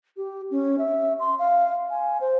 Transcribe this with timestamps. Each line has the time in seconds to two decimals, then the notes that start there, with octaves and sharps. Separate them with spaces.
0.17 G4
0.51 C#4
0.78 E5
1.20 C6
1.39 F5
1.90 G#5
2.21 C5